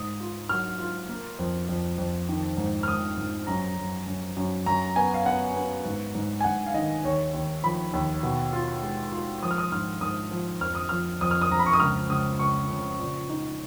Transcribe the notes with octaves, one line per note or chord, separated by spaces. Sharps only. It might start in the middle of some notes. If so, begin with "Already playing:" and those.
Already playing: G#2 D#6
F4
F#3 F6
F4
A#3
F2
F2
F2
D#3
G#2
F6
G#2 D#6
G#2
F#2 A#5
F#2
F#2
F#2
F#2 A#5
B3 G#5
F5
B3 F#5
B3
G#2
G#2
G#5
G#2 F#5
F5
D#3 D#5
D#2 C#5
D#2
F3 B5
D#2
B2
F4
G#3
F4
F3 D#6
F6
D#6
G#2 F6
G#2 D#6
F3
F2 F6
D#6
F3 F6
F2 D#6
F6
D#6
F2 A#5
B5
C#6
D#6
C#2 F6
C#2 D#6
C#2 C#6
C#3
A#2
D#4